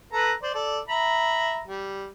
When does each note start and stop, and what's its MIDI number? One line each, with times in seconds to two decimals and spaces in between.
0.13 0.32 69
0.13 0.32 71
0.13 0.32 82
0.43 0.52 72
0.43 0.52 74
0.54 0.79 69
0.54 0.79 74
0.89 1.60 76
0.89 1.60 82
0.89 1.60 83
1.67 2.07 55